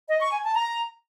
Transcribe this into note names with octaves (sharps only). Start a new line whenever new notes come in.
D#5
C#6
G#5
A5
A#5